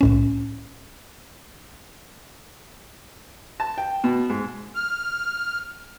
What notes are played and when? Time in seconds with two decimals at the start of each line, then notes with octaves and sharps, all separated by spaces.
0.01 C2 A2 C#4
3.60 A5
3.78 G5
4.04 B2
4.30 G#2
4.75 F6